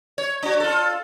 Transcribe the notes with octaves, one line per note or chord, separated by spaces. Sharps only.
C#5
D4 F#4
F4 A4